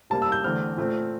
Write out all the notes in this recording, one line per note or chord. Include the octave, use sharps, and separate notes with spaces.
C3 G3 A#3 A5
E6
G6
E2 D3 A3 C4 F6
A#2 A3 C4